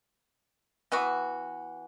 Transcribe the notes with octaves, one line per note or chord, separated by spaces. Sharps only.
E3 B3 F#4